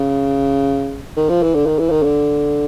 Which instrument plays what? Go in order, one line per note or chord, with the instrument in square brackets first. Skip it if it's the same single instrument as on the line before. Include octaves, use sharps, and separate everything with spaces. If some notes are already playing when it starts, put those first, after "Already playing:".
Already playing: [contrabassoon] C#3
D#3
F3
E3
D3
D#3
E3
D#3
D3